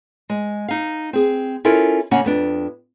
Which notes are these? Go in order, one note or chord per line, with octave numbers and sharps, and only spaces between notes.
G#3
D#4 F5
C4 G#4
C#4 E4 F4 A4 A#4
C#3 A#3 C#4 F#5
F2 B3 D4